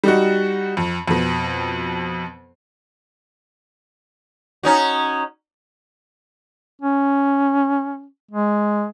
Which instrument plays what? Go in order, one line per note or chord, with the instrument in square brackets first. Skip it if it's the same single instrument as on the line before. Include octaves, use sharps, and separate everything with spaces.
[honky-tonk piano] G3 D#4 F#4
F2
F2 B2
[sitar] C#4 D#4 F#4
[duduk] C#4
G#3